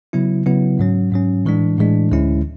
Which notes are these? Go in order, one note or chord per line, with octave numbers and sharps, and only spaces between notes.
C#3 F#3 B3 E4
C#3 F#3 B3 E4
G#2 F#3 C#4
G#2 F#3 C#4
A2 E3 G#3 D4
A2 E3 G#3 D4
D2 D3 G#3 C#4 E4